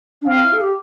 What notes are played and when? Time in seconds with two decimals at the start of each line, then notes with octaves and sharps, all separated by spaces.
0.21 D4
0.26 C4 F5
0.43 E4
0.52 A4
0.60 G4